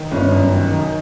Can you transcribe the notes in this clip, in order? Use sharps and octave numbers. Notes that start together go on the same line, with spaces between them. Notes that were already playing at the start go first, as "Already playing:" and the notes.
Already playing: D#3
G1 C#4
F#2
D#3
D#3